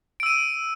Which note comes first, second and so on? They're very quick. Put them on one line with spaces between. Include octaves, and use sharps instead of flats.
D7 E6 D#7